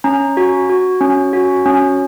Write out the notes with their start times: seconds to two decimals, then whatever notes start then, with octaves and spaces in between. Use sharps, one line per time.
0.04 C#4 A#5
0.37 F#4
0.69 F#4
1.01 C#4
1.33 F#4
1.66 C#4